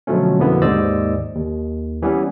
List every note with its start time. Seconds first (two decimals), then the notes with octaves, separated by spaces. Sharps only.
0.07 B2 D3 F3 F#3 A3 C#4
0.39 F2 B2 D3 A#3 B3 E4
0.62 D#2 G#2 C5 D5 D#5 E6
1.35 D#2
2.02 E3 G3 B3 C#4